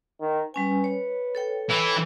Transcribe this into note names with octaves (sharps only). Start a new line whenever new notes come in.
D#3
G3 C#4 B4 G#5
C#5
A4 C#5 G5
E3 E4